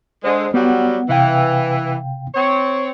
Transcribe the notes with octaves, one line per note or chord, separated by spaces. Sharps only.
D3 G#3 C5
F#3 G3 B3 F#5
C3 E3 F5 G5
C4 C#5